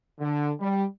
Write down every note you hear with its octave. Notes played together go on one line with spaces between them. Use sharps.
D3
G3